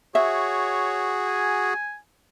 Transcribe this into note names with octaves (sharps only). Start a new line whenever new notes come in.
F#4 G#4 C#5 E5
G#5